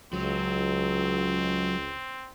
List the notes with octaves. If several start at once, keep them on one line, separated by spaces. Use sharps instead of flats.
C#2 F#3 C4